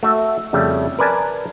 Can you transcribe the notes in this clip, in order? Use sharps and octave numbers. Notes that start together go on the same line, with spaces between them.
A3 F#4 E5
F2 C#3 G3 A3
A#4 B4 D5 G#5 A5